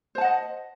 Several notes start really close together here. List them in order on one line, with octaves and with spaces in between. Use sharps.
C5 A5 F#5 D#5